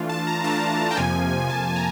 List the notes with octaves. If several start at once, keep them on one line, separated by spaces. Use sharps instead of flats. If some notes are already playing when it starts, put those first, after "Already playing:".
Already playing: E3 A3 D4 F4
A5
A#5
E3 A3 D4 F4 A5
G5
F2 C3 F3 A#3 G#5
F2 C3 F3 A#3 A5
A#5